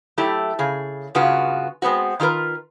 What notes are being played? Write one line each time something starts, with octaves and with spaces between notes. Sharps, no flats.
F#3 A3 E4 G4
C#3 G#4
G2 C#3 B3 F4 F#4
G#3 B3 C4 F#4
D#3 F4 G4 A#4 B4